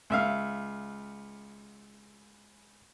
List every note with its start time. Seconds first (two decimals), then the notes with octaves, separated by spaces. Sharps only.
0.10 C#2 E5 F5